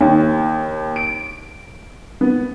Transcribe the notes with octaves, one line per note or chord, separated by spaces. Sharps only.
D#2
D7
B3